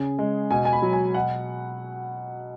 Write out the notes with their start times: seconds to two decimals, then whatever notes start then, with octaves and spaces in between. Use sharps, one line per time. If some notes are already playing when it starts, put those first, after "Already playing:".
Already playing: C#3 G#4
0.19 G#3
0.51 B2 G#5
0.65 G#5
0.73 B5
0.82 F#3
0.93 G#5
1.14 B2 F#5